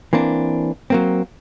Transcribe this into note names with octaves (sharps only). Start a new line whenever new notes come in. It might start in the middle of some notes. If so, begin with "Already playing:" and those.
E3 A#3 C4 D4
F#3 A#3 C4